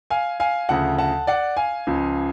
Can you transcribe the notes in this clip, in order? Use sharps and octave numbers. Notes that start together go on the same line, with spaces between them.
F5 G#5
F5 G#5
D2 C#3 F3 F#5 A5
F#5 A5
D5 F#5
F5 G#5
C#2 C#3 F3